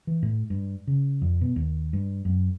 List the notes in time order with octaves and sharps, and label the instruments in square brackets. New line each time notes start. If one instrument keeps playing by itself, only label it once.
[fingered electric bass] E3
A2
G2
C#3
F2
B2
D#2
G2
F#2